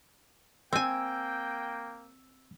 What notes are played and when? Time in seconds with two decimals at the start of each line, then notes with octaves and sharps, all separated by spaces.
0.73 A#3 C4 G5 G#5 E6